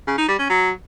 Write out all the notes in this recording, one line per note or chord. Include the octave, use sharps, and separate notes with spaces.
C#3
D#4
G3
C#4
F#3